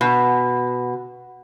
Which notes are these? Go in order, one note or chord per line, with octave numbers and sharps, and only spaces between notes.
B2